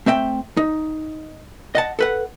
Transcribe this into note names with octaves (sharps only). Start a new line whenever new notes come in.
A3 C4 E5 G5
D#4
D#5 F#5 A5
A4 B4 F#5